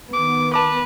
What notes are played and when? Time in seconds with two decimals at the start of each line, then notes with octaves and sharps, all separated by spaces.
0.13 D#3 B3 D6
0.54 B4 A5 D6